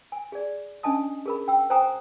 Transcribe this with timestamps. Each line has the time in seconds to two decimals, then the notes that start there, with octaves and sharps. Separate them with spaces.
0.12 G#5
0.32 G#4 D5
0.83 C#4 D4 D#5 G#5 A5 D#6
1.26 G#4 A#4 B5
1.48 G5 E6
1.70 C5 G5 G#5 A#5 D#6